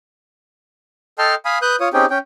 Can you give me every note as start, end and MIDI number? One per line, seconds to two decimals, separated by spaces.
1.19 1.35 69
1.19 1.35 75
1.19 1.35 79
1.19 1.35 81
1.19 1.35 84
1.19 1.35 89
1.45 1.58 77
1.45 1.58 80
1.45 1.58 83
1.45 1.58 87
1.62 1.76 71
1.62 1.76 87
1.62 1.76 90
1.62 1.76 91
1.80 1.89 65
1.80 1.89 73
1.80 1.89 87
1.93 2.06 60
1.93 2.06 61
1.93 2.06 63
1.93 2.06 67
1.93 2.06 68
1.93 2.06 79
2.10 2.18 61
2.10 2.18 79